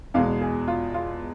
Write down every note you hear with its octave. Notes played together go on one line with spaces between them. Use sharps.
E2 B2 G#3 F5
G#4
F4
F4